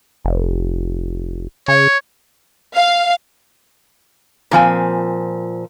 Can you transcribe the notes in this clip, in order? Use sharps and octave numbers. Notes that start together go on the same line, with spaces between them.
F1
C#3 C#5
F5
A#2 F3 C4 G#5